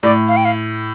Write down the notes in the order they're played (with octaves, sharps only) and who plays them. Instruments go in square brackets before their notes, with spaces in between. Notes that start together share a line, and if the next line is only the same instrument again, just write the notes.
[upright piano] A2 [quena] D5
[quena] F5
G5
F5